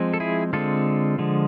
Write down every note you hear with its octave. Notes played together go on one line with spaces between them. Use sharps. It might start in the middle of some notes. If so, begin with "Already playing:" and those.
Already playing: F3 G#3 C4
A4
E4 G#4
D3 G#3 C4 F4 A4
D3 F3 G#3